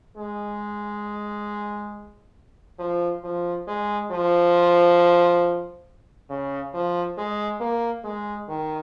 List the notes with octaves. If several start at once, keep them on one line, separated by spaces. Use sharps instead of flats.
G#3
F3
F3
G#3
F3
C#3
F3
G#3
A#3
G#3
D#3